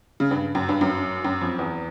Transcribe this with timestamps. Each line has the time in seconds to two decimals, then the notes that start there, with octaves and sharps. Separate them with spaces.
0.20 C#3
0.31 G2
0.55 F#2
0.69 G2
0.81 F#2
1.24 F#2
1.41 F2
1.59 E2